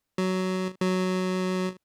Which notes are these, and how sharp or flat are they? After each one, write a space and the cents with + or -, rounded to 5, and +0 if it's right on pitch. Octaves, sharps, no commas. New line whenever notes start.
F#3 +10
F#3 +0